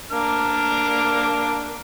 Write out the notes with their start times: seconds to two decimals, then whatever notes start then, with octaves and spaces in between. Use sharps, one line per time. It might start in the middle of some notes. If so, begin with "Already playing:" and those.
0.11 A#3 D4 F6